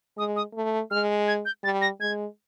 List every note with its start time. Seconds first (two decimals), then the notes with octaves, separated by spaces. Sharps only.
0.17 G#3 D#6
0.36 D#6
0.55 A3
0.91 G#3 F6
1.28 G#6
1.45 G6
1.63 G3 A6
1.81 A#6
2.00 G#3 G#6